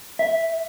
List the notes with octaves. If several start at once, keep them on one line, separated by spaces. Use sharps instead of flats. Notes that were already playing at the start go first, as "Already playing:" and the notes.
E5